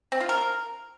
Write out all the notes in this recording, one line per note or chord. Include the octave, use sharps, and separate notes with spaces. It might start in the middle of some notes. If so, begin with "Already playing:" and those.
C4
F4
A#4